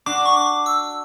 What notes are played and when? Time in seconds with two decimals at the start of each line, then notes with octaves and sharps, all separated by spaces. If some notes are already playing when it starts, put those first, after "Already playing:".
0.06 D4 F#4 D6
0.26 C#6
0.36 D6
0.66 E6